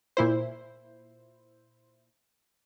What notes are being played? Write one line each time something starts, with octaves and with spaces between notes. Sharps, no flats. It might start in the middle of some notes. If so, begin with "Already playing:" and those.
A#2 E4 C5